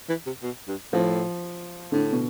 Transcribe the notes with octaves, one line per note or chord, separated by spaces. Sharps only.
E3
C3
B2
G2
A2 F3
A2 D3
B2